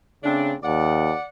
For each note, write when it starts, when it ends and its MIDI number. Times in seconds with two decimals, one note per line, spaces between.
0.23 0.55 49
0.23 0.52 57
0.23 0.52 60
0.23 0.52 62
0.62 1.13 39
0.62 1.26 74
0.62 1.26 78